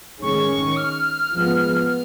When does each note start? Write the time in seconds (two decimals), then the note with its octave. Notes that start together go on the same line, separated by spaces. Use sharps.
0.21 D#3 G#3 C#4 C#6
0.77 F6
1.32 F3 G#3 B3
1.88 F6